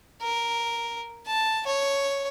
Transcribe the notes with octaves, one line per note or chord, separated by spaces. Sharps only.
A#4
A5
C#5